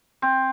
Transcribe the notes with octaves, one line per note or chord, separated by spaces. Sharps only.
C4